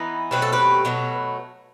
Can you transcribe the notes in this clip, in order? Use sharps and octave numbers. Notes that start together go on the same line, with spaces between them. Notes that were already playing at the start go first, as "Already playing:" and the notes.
Already playing: E3 B3 D#4
B2 F#3 A3 C4 B4
A4
G4 B4
B2 F#3 A3